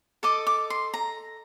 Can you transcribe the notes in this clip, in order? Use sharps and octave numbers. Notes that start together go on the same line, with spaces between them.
A4 D#5 D6
D6
C6
A#5